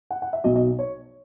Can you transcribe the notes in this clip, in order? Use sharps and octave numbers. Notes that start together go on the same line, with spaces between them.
F#5
F#5
E5
B1 B2 F#3 D#5
D#5
C#5